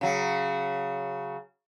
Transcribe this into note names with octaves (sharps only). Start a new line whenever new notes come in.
C#3 F#3